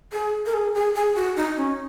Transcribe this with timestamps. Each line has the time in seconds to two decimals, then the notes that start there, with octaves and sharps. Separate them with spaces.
0.13 G#4
0.46 A#4
0.54 G#4
0.74 G#4
0.95 G#4
1.15 F#4
1.36 D#4
1.57 C#4